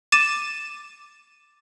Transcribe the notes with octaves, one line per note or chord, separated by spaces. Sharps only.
D6 A6 D#7 E7